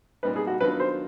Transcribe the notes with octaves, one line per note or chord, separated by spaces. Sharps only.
A#2 G3 B3 D#4 B4
G#4
F#4
D#3 F#3 B3 D4 F4 B4
C5